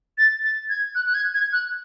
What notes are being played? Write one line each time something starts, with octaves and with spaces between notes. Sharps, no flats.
A6
A6
G#6
F#6
F#6
G#6
G#6
F#6